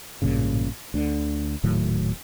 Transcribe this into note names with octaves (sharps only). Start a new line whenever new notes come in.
A1 G2 A#2 C#3
D2 D3
D#1 A2 D#3 F#3